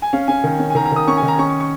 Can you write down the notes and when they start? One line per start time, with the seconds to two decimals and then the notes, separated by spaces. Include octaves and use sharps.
0.02 G#5
0.13 C#4 F5
0.28 C#4 G#5
0.44 D#3
0.59 C#4
0.70 G#5
0.75 D#3 A#5
0.85 A#5
0.92 D#3 D#6
1.07 C#4 C#6
1.17 G#5
1.23 D#3
1.28 A#5
1.38 C#4 C#6
1.49 C#6
1.60 C#6